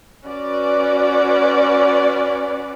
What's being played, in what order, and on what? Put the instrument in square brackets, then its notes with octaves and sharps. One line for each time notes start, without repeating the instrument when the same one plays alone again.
[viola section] C#4 F#4 B4 D5